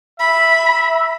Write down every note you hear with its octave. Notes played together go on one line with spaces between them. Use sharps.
E5 B5